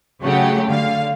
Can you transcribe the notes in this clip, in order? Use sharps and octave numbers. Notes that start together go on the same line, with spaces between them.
C#3 F#3 A3 G4 F#5
D3 F5